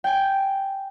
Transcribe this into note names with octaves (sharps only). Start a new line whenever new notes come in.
G5 G#5